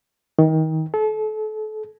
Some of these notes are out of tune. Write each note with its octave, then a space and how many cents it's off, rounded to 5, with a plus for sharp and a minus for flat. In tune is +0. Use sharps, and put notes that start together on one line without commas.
D#3 +30
A4 -35